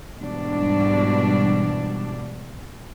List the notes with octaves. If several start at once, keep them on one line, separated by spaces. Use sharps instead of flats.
G#2 B2 E3 G3 D4